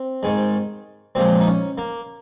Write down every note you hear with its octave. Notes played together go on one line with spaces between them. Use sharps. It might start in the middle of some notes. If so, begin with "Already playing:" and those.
Already playing: C4
G#2 D#3 G#3
A#2 F3 G#3 C4
D#4
C#4
A#3